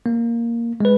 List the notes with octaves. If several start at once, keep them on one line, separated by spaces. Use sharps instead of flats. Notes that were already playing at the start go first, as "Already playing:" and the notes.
A#3
G#3 B4